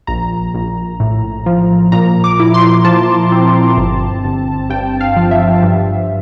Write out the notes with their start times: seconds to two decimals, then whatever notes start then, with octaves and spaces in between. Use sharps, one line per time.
0.07 A#1 A#5
0.54 A#1
1.00 A2
1.46 F3
1.92 A#2 A#5
2.24 D6
2.40 E4
2.54 C6
2.85 F3 A5
3.32 C4
3.77 G1
4.24 G1
4.70 G2 G5
5.01 F5
5.16 F3
5.31 E5
5.63 G2